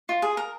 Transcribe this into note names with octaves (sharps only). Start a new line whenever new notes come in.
F4
G#4
A#4